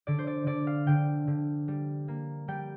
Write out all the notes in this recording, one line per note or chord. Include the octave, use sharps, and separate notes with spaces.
D3 D5
C5
D5
D3 D5
F5
D3 G5
D3
G3
A#3
G3 G5